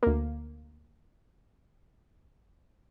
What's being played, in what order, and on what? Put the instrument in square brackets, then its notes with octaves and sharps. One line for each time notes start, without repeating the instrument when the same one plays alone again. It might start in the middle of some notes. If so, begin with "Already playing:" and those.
[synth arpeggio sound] D2 A#3